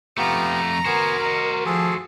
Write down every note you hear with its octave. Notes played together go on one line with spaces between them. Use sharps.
F2 A3 B3 F4 G4 A#5
B3 F#4 A#4 C5 G#5
D#5
F3 G#4 A4